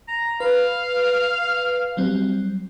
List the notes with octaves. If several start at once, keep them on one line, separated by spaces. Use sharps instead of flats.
A#5
B4 F5
F#3 G3 C4